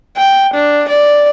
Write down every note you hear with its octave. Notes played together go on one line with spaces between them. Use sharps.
G5
D4
D5